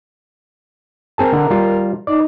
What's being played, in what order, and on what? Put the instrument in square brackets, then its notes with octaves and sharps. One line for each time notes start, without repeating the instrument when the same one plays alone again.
[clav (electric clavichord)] C4 G#4 A5 [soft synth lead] A#4
[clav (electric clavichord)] D3 F#5
G3 F4
[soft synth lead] D#4 [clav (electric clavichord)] D5